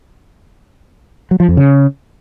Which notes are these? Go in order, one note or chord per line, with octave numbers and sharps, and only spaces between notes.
F#3
F3
F2
C#3